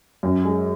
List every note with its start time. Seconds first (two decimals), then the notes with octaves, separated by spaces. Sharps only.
0.23 F#2
0.45 G#3